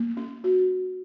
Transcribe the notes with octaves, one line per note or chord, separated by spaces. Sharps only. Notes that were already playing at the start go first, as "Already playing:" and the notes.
Already playing: A#3
C#4
F#4